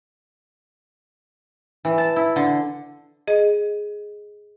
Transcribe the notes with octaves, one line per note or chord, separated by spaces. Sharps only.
E3
A5
E4
D3
G#4 D#5